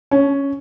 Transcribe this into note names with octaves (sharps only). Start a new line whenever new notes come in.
C#4